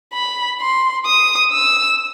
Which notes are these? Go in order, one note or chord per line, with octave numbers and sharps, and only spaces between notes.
B5
C6
D#6
E6